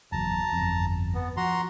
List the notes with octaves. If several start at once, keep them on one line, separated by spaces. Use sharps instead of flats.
F#1 E2 F#3 A5 A#5
G1 F2
B3
F3 F#4 A#5 C6